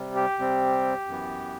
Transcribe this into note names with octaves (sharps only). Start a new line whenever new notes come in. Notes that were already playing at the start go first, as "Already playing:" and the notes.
Already playing: C3 G3
G4
C3 G3 C4
F#2 E3 B3